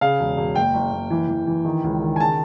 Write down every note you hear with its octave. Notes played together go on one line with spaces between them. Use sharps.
C#3 F5
E1
E1
F#1 G5
F#1
F#1
E3
E3
E3
D#3
C#2
D#3
G#5
C#3 A5